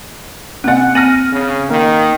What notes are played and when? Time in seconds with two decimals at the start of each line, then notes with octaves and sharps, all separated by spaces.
0.64 C3 A#3 C4 F#5
0.95 C4 F6 A#6 D#7
1.32 C#3
1.70 D#3 A#3